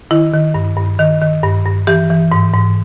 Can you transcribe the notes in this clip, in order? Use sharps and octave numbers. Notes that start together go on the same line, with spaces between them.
D#3 E4
D#3
G2
G2
D#3
D#3
G2
G2
E3 G4
E3
G#2
G#2